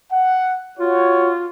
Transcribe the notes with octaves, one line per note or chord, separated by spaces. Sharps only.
F#5
F4 F#4 C#5